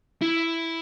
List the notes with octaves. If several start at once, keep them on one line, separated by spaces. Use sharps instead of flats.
E4